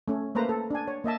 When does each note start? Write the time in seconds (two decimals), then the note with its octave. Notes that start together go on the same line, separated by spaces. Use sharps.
0.08 A3 C#4
0.35 A3 A#3 B4 C5 A#5
0.49 A4
0.70 D4 G#5
0.88 C#5
1.04 A#3 D#5 E5 A5